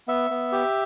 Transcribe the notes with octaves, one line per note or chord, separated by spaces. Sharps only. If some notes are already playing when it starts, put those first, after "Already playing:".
B3 E5
B3
G4